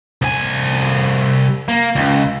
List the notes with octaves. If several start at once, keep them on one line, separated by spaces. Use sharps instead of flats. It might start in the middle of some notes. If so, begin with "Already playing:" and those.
C2 G#5
A#3
C#2